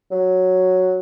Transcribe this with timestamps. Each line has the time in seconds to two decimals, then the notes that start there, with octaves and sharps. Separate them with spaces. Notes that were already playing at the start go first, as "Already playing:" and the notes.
0.11 F#3